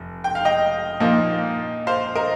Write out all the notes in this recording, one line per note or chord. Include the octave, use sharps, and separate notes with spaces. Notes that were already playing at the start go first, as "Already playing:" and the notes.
Already playing: F1
G5
F5
D#5 G5
A#2 F3 A#3 D#4
C5 F5
A#4 D#5